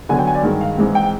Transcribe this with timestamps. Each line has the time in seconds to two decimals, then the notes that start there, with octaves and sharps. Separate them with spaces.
0.09 D3 F#3 B3 G#5
0.19 G5
0.27 G#5
0.35 D5
0.43 G2 D#3 G#3
0.61 F5
0.77 G#2 E3 G#3 C4
0.95 G5